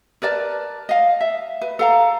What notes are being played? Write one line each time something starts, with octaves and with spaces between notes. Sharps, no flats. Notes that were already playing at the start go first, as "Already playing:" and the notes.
A#4 B4 D5 A5
D#5 F5
E5
B4
A4 F5 A#5